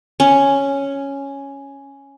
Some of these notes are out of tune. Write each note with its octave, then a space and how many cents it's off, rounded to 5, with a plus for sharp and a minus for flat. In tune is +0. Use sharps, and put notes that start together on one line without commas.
C#4 +0